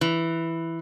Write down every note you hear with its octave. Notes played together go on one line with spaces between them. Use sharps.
E3